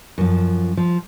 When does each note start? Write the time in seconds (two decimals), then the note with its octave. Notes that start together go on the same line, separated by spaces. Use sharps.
0.18 F#2 F3
0.77 F3